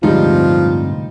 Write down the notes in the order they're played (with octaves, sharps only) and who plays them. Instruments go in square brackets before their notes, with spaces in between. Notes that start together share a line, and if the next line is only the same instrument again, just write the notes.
[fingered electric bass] D1 D2 G#3 [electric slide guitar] G2 C3 [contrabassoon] F3 [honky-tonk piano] G3 D#4